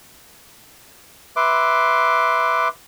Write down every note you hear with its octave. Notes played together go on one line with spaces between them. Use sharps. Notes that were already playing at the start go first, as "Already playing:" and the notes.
B4 E5 C6 D6